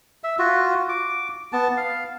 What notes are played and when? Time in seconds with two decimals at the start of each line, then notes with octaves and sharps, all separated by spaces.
0.24 E5
0.39 F4 F#4
0.89 D6
1.53 B3 A5
1.77 F5